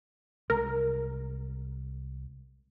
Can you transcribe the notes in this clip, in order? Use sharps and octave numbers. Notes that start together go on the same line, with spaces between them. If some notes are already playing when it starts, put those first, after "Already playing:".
C2 G#3 A#4